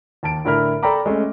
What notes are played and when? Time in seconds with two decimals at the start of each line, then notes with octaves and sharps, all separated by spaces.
0.23 D#2 A5 D7
0.45 A2 D3 E4 A#4 B5 F6
0.83 A4 D5 G5 A#5 B5 D6
1.06 G#3 A3 C#4